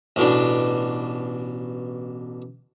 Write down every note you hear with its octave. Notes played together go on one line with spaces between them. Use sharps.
A1 B2 D4